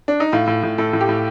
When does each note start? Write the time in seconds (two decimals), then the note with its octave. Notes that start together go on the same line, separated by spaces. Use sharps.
0.08 D4
0.20 D#4
0.32 A2 F4
0.47 A2
0.63 A2
0.78 A2 A4
0.93 A2
1.01 G4
1.09 A2